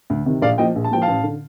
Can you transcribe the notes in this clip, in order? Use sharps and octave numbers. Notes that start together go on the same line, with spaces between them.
D2
C3 D#3
A#1 D5 F5
A#2 F3 D#5 G5
A#1
A5
A#2 F3 G5
F5 A5
A1
D3